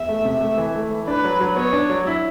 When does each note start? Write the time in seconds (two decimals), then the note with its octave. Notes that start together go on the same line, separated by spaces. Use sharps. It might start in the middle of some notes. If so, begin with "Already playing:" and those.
Already playing: E2 E5
0.09 A3
0.25 C3
0.41 A3
0.58 E3
0.75 A3
0.91 E3
1.08 D4 B4
1.24 F#3
1.41 F#3
1.56 B3 C#5
1.73 D4
1.90 F#3
2.07 E4